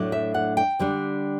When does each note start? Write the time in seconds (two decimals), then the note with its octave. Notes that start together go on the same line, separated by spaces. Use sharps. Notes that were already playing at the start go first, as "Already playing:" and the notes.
Already playing: A2 F#3 A3 D4
0.12 E5
0.34 F#5
0.57 G5
0.79 D3 G3 D4